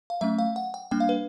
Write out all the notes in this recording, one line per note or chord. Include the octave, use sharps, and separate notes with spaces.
F5
F#3 A3 C#4 E5
F5
F#5
G5
G3 A#3 D4 G5
F5
B4